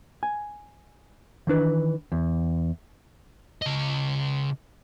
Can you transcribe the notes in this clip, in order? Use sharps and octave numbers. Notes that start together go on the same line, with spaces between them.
G#5
D#3 E3 D4 B4
E2
C#3 D#5